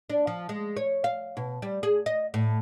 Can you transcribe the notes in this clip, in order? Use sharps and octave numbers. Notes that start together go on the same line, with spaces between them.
D4
F3
G#3
C#5
F5
B2
G3
G#4
D#5
A2